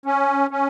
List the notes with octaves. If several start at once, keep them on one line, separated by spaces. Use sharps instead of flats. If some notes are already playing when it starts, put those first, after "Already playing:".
C#4
C#4